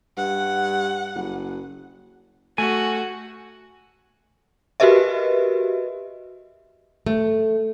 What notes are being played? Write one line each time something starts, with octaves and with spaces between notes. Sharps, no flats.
G2 F#5
F#1
A3 F#4 G#5
F#4 G4 A#4 B4 D#5 E5
A3